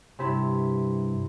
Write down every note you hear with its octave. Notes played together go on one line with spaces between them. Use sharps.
G2 C3 E4